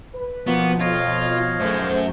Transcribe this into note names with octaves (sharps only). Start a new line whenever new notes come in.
B4
B2 F3 A#3 B3 F#5 C#6
F2 F4 C#5 D#5 F5
F#2 D#3 A3 G#4 C5 G6